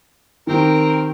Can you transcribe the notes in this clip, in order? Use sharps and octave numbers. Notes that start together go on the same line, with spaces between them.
D#3 C4 G4 A#4